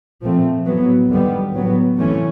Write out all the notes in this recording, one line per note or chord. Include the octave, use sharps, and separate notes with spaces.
A#2 F3 A3 C4
A2 F#3 B3
D#2 D3 G3 B3
A2 F#3 B3
C3 E3 A3 C#4